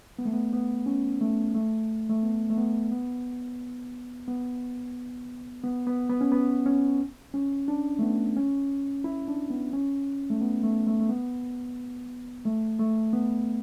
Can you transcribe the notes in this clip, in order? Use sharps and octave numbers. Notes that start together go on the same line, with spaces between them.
B3
A3
B3
B3
C#4
A3
A3
A3
B3
A3
B3
B3
B3
B3
B3
B3
C#4
B3
C#4
C#4
D4
A3
B3
C#4
E4
D4
B3
C#4
A3
B3
A3
A3
A3
B3
A3
A3
B3